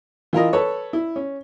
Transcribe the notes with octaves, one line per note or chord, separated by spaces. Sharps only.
E3 F4 A#4 D#5
A4 B4 C#5
E4
C#4